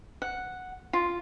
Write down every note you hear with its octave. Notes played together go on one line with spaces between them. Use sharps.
F#5
F4